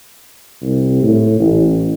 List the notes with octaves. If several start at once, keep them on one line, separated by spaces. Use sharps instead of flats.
C2
A2
A1